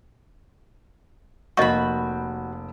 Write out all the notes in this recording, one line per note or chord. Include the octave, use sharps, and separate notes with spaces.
F1 A#3 F#4 D#5 B5 C#6 G6